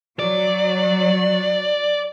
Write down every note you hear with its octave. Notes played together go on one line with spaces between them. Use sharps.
F#3 D5